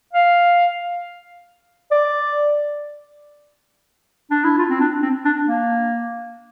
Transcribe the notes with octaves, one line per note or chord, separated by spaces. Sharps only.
F5
D5
D4
E4
F4
C4
D4
C4
D4
A#3